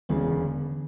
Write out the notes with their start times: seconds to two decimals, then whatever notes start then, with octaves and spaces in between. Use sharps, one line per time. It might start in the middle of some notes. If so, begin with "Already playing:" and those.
0.09 E1 E2 C#3 B3
0.32 D3